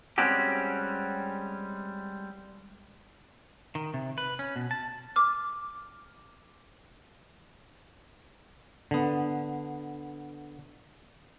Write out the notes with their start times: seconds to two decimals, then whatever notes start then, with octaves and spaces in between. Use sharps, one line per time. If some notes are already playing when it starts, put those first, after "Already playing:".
0.18 G3 G#3 C4 C#4 F#4 G4
3.75 D#3
3.94 C3
4.18 B4
4.39 C#4
4.56 B2
4.71 A5
5.16 D6 F6
8.91 D3 B3